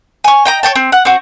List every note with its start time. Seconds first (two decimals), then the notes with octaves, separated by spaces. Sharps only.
0.24 G#5 C#6
0.45 D#5 G5 A#5
0.63 C#5 G5 A5
0.76 C4
0.92 F#5
1.05 C4 F#4